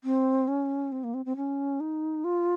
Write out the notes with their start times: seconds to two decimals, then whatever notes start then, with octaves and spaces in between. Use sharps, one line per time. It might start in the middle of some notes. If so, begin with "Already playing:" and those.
0.04 C4
0.48 C#4
0.92 C4
1.04 A#3
1.14 C4
1.26 C4
1.37 C#4
1.80 D#4
2.24 F4